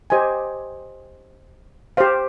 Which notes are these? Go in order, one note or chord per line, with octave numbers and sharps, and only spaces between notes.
G4 C5 D#5 G#5
G4 C5 F5